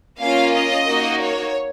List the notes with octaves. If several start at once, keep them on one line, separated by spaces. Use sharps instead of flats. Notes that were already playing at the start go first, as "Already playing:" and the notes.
A#3 C#4 F4 F5
D#5
A#3 D#4 F#4
C#5